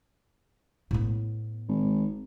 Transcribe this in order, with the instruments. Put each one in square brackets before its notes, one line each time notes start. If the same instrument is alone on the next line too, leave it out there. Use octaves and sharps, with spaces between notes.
[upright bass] A2 B3
[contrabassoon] G#1